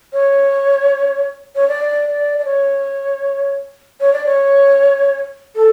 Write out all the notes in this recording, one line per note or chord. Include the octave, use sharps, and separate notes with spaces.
C#5
C#5
D5
D5
D5
C#5
C#5
D5
C#5
A4